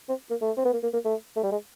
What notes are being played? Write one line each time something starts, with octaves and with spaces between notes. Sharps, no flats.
C4
A#3
A3
C4
B3
A#3
A#3
A#3
A3
A3
G3
G#3